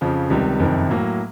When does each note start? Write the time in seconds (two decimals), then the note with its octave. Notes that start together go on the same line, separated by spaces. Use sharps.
0.01 F2 C#3 F3
0.30 C#2 C3 D#3 G3
0.59 F#1 F2 C3 D#3
0.89 A2 F#3 A#3